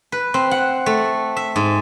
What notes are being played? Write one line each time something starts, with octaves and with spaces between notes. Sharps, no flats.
B4
C4
F#5
A3
E5
G#2